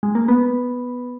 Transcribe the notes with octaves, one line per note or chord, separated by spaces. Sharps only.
G#3
A#3
B3